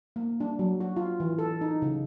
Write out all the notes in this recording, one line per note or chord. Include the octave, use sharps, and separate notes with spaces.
A#3
D4
F#3
F#4
F4
E3
A4
D#4
C#3